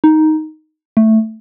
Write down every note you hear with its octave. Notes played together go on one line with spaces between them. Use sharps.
D#4
A3